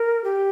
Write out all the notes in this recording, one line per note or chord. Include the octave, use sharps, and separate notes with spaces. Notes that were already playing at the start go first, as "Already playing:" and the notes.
Already playing: A#4
G4